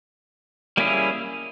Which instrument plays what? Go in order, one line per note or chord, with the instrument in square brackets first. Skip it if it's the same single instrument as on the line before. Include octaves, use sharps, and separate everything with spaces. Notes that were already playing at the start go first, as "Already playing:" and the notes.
[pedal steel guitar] G3 A#3 C#4 E4 G#4